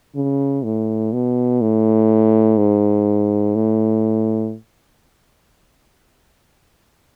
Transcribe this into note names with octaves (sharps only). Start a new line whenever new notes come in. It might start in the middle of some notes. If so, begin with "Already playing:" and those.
C#3
A2
B2
A2
G#2
A2